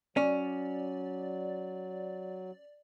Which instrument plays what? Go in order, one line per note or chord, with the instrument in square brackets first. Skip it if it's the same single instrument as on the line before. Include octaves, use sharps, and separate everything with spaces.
[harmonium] F#3 [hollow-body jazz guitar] C#4 [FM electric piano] D5